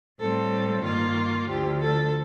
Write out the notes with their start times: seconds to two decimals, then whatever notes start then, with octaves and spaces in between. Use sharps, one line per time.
0.19 A2 G3 C4 A4
0.84 G2 D#3 A#3 F4
1.48 D2 D3 F3 G4
1.81 A4